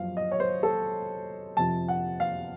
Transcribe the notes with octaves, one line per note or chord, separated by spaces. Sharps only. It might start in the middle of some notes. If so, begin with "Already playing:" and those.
Already playing: F#2 F3 F5
D#5
C#5
C5
A4
F2 C3 F3 A5
F#5
F5